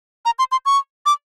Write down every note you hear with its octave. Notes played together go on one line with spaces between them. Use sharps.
A#5
C6
C6
C#6
D6